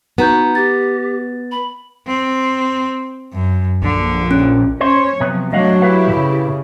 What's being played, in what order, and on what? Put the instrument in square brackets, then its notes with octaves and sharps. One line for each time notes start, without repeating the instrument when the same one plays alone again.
[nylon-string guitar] B3 [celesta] D#4 A#5 G6 [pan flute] F#4
[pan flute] G4 [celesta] A6
[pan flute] B5
[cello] C4
F#2
[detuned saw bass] A#1 [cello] D3
[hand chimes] C#4
[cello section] C#4 C#5 [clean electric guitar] C5
[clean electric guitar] C3 B3 [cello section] F3 F#3
[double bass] F#3 [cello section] A3 D4 [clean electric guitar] D#5 F5 F#5
[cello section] E4 G4 [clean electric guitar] B4 F5
[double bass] C#3